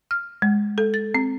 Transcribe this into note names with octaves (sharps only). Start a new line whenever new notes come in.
F6
G#3
A4
A6
C4